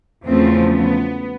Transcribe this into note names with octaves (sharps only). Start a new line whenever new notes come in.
E2 C#3 F3 A3 C4
B3